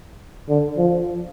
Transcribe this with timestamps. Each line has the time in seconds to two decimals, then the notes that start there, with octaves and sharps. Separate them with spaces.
0.49 D3
0.77 F3